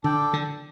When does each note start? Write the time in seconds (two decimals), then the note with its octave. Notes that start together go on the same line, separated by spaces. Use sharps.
0.03 D3 D4 A4 D5 G5
0.33 D3